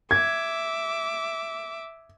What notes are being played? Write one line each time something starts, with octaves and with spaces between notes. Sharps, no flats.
E5 D6 G#6